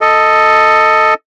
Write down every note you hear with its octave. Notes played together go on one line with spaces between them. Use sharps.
A4 D#5